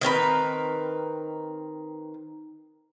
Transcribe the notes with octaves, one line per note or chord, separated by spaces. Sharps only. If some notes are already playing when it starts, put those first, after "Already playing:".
D#3 C4 A#4 B4